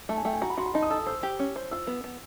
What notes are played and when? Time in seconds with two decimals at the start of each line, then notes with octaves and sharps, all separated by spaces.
0.09 A3 A5
0.18 G#5
0.25 A3 G5
0.34 G#5
0.42 F#4 A#5
0.50 B5
0.57 F#4 C6
0.66 B5
0.74 D#4 A5
0.82 D#6
0.90 A4 E6
0.99 D#6
1.06 C5 E6
1.23 G4
1.39 C#4
1.56 C5
1.71 F4 E6
1.87 B3
2.04 B3